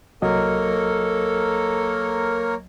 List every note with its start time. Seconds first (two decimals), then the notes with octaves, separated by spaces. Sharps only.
0.22 C2 F#3 A#3 A4 A#4 C#5 D#5